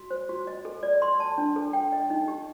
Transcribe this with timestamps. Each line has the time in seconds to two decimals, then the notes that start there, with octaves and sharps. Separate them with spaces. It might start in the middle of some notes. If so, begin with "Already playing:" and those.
Already playing: F#4
0.10 C5
0.29 F#4
0.47 D#5
0.65 A4
0.83 D5
1.02 C6
1.20 A5
1.38 D4
1.56 A4
1.73 G5
1.92 D#5
2.10 D#4
2.28 G4